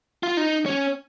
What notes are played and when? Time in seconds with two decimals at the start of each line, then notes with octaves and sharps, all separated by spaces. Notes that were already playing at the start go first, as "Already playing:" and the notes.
0.23 F4
0.37 D#4
0.66 C#4